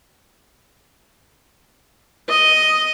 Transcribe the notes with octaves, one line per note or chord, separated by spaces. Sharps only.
D#5